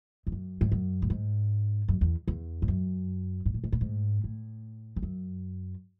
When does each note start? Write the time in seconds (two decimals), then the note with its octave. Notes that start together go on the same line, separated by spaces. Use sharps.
0.27 E2
0.32 F#2
0.61 G#2
0.72 F#2
1.02 A2
1.10 G#2
1.88 F#2
2.01 E2
2.28 E2
2.62 G#2
2.68 F#2
3.46 G#2
3.54 A2
3.64 G#2
3.72 A2
3.81 G#2
4.24 A2
4.96 E2
5.03 F#2